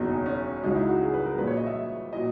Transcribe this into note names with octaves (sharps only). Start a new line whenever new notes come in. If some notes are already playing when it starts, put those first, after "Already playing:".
Already playing: F#1 E2 B2 F#3 D#4
C#4
C#2 C#3 F#3 D#4
E4
F#4
G#4
B4
A#4
A#1 A#2 F#3 B4
C#5
D#5
E5
A#2 F#3 D#5